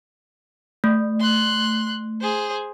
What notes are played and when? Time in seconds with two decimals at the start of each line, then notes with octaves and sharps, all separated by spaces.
0.84 A3
1.20 C6 F#6
2.21 G#4 C5